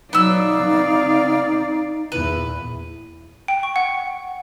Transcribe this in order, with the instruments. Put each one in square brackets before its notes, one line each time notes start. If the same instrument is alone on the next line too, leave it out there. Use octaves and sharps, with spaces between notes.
[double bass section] B2 F#3 [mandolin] B3 E6 [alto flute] D#4 [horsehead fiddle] D5 F5
[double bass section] C#3 C4
[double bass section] E2 A#2 D#3 [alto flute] E4 [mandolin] B4
[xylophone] G5
C#6
F#5